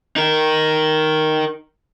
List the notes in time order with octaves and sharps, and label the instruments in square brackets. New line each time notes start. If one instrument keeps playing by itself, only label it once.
[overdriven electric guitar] D#4 A#4